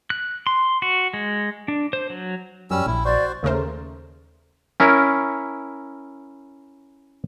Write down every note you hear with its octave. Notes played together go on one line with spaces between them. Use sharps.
F#6
C6
F#4
G#3
D4
C5
F#3
F#2 G3 C#4 E6
A#1 E4
F#4 C5 D5
D#2 C#3 A3 A#4 C5
C#4 E4 A#4